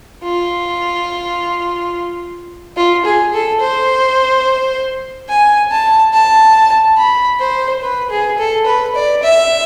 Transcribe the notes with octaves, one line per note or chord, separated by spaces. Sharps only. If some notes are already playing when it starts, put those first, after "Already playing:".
F4
F4
G#4
A4
C5
G#5
A5
A5
B5
C5
B4
G#4
A4
B4
D5
E5